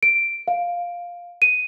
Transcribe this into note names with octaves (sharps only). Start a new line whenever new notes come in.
D7
F5
D#7